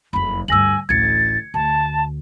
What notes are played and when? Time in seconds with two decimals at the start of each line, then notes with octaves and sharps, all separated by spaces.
0.13 F#1 F2 B5
0.48 D2 G2 G#5 E6 A#6 F#7
0.89 A1 D2 G#6 A6 C#7
1.54 D2 A5